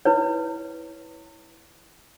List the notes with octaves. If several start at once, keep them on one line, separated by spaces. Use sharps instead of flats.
E4 B4 C#5